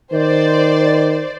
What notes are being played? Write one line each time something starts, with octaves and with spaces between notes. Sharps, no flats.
D#3 C5 D5